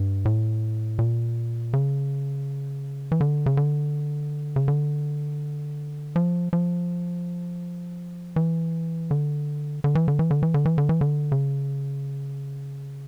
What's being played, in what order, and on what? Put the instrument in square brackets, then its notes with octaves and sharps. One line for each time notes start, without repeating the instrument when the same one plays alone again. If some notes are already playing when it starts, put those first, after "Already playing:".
Already playing: [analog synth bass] G2
A2
A#2
C#3
E3
D3
C#3
D3
C#3
D3
F3
F3
E3
D3
D3
E3
D3
E3
D3
E3
D3
E3
D3
E3
D3
C#3